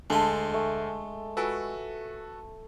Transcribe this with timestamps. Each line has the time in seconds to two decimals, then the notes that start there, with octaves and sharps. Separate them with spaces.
0.10 D2 G#3 D4 A4 F5 A5 C6
0.54 A3
1.37 F4 F#4 A4 B4 G#5 E6